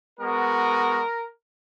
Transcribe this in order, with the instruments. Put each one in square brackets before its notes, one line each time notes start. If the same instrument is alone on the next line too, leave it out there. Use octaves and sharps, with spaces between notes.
[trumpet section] G#3 B3 F#4 A#4